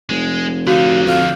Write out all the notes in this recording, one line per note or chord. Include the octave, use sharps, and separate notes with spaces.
F1 G#3
D3 D#4 F#4 F5
F2 F5